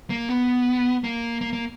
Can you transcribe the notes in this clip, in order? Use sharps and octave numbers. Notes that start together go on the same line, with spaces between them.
A#3
B3
A#3
A#3
A#3